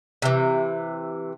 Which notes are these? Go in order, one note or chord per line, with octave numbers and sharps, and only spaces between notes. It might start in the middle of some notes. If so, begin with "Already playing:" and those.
C3 E3